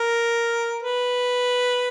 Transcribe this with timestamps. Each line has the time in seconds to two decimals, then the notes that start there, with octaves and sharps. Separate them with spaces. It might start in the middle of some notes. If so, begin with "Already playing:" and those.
Already playing: A#4
0.83 B4